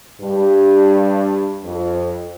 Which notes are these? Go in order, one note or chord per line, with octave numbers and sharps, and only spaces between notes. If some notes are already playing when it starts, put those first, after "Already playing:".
G2
F2